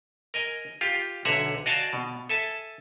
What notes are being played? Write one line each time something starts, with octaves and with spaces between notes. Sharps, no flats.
A#4 D#5 G#5
F4 G4
B1 D3 E5 F#5 G#5 A#5
F#4 D5 D#5 F5 G#5 A5
B2
A4 E5 G#5 A5